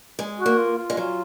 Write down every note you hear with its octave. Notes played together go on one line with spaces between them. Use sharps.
G#3
F#4
A#3
F4
F4
G#3
F#3 F4